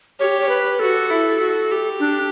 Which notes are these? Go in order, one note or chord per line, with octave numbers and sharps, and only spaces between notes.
G4 C#5
C#5
B4
F#4 A4
E4
F#4
G4
D4